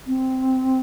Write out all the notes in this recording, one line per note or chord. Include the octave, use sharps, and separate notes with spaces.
C4